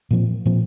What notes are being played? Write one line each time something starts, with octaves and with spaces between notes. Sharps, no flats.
A#2 F3 C4
A#2 F3 C4